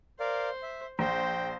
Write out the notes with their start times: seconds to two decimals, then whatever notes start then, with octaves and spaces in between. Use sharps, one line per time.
0.20 A#4 C5 D5 F5
0.63 E5
0.99 A#1 C5 G5